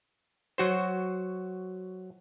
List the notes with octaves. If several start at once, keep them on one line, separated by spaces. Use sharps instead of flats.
F#3 F#4 C5